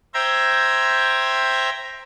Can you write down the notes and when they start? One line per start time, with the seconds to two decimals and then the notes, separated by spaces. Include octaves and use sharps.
0.14 C5 E5 G5 A#5 G#6